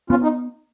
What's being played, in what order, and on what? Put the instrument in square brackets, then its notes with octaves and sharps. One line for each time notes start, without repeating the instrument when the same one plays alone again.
[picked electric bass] B3 [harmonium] C#4 F4
[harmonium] D#4